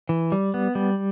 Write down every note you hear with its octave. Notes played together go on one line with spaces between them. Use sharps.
E3
G3
B3
G3